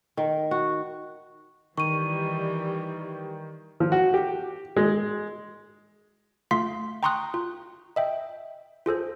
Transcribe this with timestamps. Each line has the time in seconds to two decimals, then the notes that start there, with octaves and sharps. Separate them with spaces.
0.17 D#3
0.51 F#4
1.78 D#3 E3 G3 C#6 D#7
3.80 F3
3.92 F#4
4.14 G4
4.77 G#3
6.51 A3 F4 F5 C6 B6
7.03 G5 A#5 C6 C#6 D#6 F#6
7.34 F4
7.96 D#5 E5 G5
8.86 F4 G#4 A4 C5